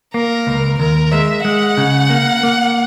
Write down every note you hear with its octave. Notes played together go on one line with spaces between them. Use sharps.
A#3 A#4
C#2
D#2 A#4
G#3 E5
G#3 F#5
C#3
A#3
A#3